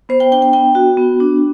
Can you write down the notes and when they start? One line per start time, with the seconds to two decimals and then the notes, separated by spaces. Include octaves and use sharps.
0.09 B3 C5
0.20 G5
0.31 D4 G5
0.42 G5
0.53 B3 G5
0.75 F#4
0.97 B3
1.20 D4